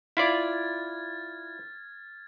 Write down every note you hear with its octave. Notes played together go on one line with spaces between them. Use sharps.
E4 F4 D5 F6 G#6 A6